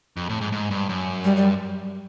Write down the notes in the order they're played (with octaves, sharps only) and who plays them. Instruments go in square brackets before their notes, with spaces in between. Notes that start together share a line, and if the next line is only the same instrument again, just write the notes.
[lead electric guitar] F2
A2
G#2
G#2
G2
F#2
[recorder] G3
G3